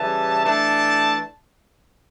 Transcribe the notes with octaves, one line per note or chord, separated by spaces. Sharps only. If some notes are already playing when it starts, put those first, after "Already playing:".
Already playing: C#3 E3 G3 A5
E3 A3 D4 A5